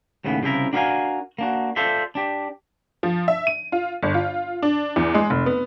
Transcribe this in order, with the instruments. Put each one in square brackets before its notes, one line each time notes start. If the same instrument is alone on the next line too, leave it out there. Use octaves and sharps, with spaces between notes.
[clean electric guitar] D#2 A2 C#3 B3
C2 C#3 F3 E4 A#4
D4 F#4 A#4 D#5 F5 G#5
A#3 D4 F#4
F4 A4 C5 D5 E5
D4 G4
[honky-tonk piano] F3
E5
D#7
F4
G1
F4
D4
E2
G#3
F1
B3